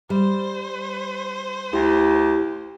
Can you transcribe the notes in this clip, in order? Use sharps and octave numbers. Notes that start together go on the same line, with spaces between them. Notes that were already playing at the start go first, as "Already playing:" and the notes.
G3 C5
D2 E4 G4